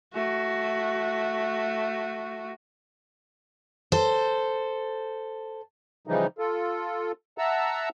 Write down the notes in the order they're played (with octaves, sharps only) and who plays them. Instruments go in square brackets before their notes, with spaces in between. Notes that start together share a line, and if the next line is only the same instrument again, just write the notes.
[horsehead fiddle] A3 F#4
[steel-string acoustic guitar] A4 C5
[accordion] C#3 E3 F3 G3 D#4
F4 A4
E5 F#5 A5 A#5 E6